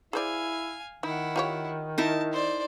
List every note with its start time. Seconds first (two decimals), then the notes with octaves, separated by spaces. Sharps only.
0.13 E4 G#4 C5 D5 F5 G#5
1.03 D#3 D#4 E4 F#5
1.36 F4 G4 C#5
1.98 D#4 E4 A#4 A5
2.33 C5 D5